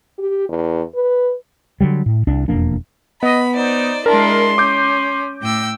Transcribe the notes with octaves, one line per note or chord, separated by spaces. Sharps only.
G4
E2
B4
D3 F#3 G3
A2
C2 D4
E1 F2 A#3 D4
B3 D#5 B5
D#4 C5 D5
G#3 D4 E4 A#4 A5 C6
C#4 D6 G6
A2 G5 E6